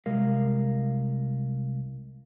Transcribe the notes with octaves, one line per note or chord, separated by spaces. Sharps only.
C2 G#3 A#4 F5